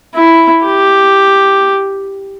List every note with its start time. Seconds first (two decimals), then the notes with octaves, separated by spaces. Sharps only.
0.15 E4
0.65 G4